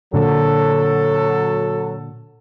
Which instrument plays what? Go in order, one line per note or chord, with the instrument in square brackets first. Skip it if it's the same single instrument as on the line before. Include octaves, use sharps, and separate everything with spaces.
[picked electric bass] A#2 D3 [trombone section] F#3 A4